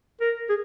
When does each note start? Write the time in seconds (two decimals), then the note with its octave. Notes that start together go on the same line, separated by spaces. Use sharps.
0.21 A#4
0.49 G#4